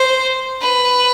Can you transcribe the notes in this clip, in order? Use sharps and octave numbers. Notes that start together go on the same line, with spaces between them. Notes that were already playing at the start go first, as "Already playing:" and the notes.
Already playing: C5
B4